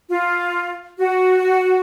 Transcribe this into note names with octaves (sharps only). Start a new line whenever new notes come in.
F4
F#4